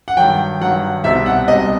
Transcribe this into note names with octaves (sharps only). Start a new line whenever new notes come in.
F#5
G2 D#3 F#3 G5
G2 D#3 F#3 F#5
C2 B2 G3 C4 D#4 E5
F#5
C2 B2 G3 C4 D#4 D#5